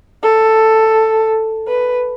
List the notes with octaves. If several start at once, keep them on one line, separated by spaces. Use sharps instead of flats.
A4
B4